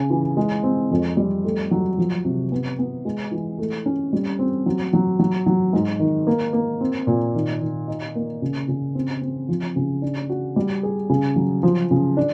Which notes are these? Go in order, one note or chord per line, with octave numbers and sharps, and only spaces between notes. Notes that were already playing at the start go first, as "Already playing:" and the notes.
Already playing: C#3
E3
G#3
C4
F2
G3
A3
F#3
F3
C3
B3
B3
G#3
E3
A3
C#4
G3
C4
F#3
F#3
F#3
F#3
G#2
D#3
A#3
A#3
C4
A#2
D#3
D#3
D#4
A#3
C#3
C#3
C4
C4
F3
C#3
D4
F#4
G3
G#4
C#3
F#3
F3
C#3
D4